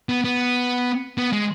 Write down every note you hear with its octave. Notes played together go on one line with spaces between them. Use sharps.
B3
B3
B3
G#3